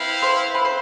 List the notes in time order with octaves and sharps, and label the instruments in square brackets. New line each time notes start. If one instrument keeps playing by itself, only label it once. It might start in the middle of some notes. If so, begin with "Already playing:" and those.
Already playing: [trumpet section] C4 E4 B4 F5
[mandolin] C5
B4
C5